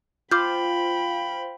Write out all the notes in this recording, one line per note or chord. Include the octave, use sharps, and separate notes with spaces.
F4 C5 F5 G5 B5 D6 F6 G6